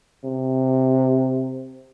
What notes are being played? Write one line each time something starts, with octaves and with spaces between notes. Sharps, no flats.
C3